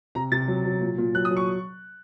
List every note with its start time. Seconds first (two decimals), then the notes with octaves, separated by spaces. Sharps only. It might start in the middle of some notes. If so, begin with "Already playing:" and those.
0.15 C3 A#5
0.32 C3 A6
0.48 F#3
0.65 F#3
0.81 A#2
0.98 A#2
1.15 F#3 F#6
1.25 D#6
1.30 F#3
1.37 C#6